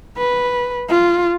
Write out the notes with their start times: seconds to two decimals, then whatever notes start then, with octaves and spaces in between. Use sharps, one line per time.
0.17 B4
0.89 F4